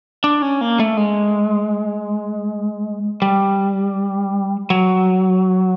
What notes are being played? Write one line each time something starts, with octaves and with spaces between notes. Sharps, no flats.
D4
C#4
A#3
A3
G#3
G3
F#3